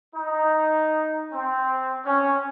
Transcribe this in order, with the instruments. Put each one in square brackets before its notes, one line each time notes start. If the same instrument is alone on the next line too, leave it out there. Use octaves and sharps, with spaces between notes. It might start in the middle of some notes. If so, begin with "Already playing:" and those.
[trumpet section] D#4
C4
C#4